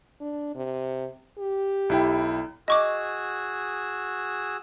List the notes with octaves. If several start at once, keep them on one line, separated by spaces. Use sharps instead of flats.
D4
C3
G4
B1 E4 G5
F#4 G#4 D#5 C#6 D6 E6